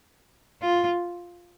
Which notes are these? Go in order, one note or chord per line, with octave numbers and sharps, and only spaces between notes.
F4